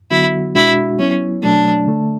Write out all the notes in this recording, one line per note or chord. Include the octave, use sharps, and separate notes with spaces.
D3 F#3 B3 E4 F#4
B2 G#3 D4 E4 F#4
F#3 B3 C#4 E4
B2 F#3 A3 D4
D3 A3 D4